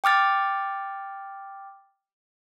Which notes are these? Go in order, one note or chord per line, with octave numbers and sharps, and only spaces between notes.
G5 D6 F6 A6